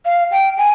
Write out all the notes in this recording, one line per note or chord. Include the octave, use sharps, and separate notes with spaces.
F5
G5
G#5